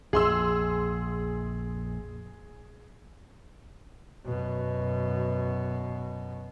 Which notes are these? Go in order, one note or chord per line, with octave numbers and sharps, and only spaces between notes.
A#1 F2 G#4 C6 E6
F#2 B2